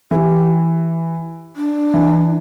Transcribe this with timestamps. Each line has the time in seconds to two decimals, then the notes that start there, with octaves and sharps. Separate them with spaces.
0.11 E3 G4 A4
1.56 D4
1.94 E3